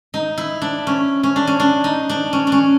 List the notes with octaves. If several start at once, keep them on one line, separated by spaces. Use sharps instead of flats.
D#4
E4
D4
C#4
C#4
D4
C#4
D4
D#4
D4
C#4
D4
C#4